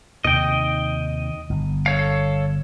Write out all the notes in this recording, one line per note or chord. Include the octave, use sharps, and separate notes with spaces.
D#2 C3 D#3 D#5 G5
G1
A4 C#5 F5